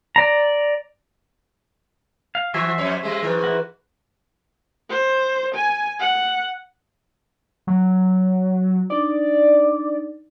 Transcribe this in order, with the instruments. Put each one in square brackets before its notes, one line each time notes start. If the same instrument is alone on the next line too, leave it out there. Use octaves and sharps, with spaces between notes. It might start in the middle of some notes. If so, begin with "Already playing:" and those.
[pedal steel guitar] D5 A#5
F5
[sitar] E3 F#4 [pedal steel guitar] C5 E5 G#5
[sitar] F2 C#5
G3 G#3
[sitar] G#2 E3 [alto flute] B4
[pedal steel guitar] E4 F#4
[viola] C5
G#5
F#5
[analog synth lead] F#3
[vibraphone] D4 D#4 [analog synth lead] D5